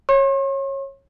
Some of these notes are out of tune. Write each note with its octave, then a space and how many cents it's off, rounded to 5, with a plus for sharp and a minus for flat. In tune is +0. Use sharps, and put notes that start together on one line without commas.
C#5 -20 C6 +45